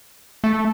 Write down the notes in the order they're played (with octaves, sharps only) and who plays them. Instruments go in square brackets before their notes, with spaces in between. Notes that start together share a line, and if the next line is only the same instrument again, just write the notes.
[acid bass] A3